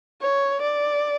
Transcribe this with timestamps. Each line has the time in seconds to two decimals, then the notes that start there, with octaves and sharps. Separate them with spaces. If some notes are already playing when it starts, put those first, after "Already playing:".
0.21 C#5
0.62 D5